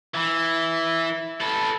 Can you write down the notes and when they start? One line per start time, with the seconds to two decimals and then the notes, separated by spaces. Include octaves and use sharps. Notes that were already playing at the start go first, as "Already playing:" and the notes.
0.15 E3
1.41 A4 B4